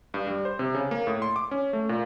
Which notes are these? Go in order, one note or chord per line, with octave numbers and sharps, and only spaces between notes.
G2
G3
C5
C3
C#3
A#3
A2
C6
D6
C#4
A3
A#2